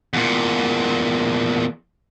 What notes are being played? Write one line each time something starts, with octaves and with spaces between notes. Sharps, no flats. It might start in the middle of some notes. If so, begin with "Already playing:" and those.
E2 A#2